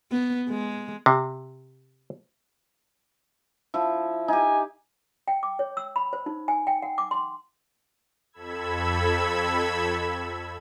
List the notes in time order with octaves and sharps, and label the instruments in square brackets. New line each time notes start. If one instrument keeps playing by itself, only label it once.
[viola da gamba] B3
G#3
[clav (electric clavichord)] C3
[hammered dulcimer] F3 E4
[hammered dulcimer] D#4 G4 [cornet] G#5
[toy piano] G5
D6
C#5
E6
B5
C5
D#4
G#5
G5
F#5
D6
C6
[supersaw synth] F2 A4 B5 E6 G#6